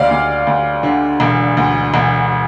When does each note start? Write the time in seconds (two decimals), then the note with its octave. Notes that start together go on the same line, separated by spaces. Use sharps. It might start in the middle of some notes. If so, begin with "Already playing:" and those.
Already playing: D2 D5 F5
0.11 D2
0.47 D2
0.83 D3
1.20 E1
1.57 D2
1.94 E1